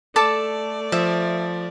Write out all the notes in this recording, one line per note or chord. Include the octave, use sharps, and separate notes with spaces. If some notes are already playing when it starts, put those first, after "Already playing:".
A3 A4 D5 A5 D6
F3 E5